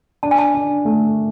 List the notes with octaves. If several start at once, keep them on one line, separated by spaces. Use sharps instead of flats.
D4 A5
G#5
A5
D4
A3